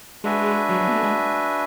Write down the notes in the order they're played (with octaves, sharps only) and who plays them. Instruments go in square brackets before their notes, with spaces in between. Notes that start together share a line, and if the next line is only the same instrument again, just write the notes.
[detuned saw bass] G#3 [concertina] D4 F#4 B4 E5 G#5
[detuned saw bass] F#3
F#3
B3
A3
G#3